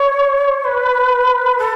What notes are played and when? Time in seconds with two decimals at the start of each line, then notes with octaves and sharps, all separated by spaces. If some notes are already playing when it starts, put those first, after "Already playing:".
Already playing: C#5
0.64 B4
1.59 A4